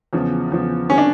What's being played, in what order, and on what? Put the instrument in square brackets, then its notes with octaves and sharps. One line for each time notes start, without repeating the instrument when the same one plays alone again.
[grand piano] E2 C#3 F3
E2 C#3 F3
[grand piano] D3 G3 C4 [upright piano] C#4
[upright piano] D4